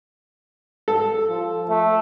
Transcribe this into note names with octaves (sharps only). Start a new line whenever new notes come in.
A4
F3
A3